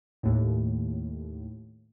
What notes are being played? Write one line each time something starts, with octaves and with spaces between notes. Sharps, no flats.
D#2 A2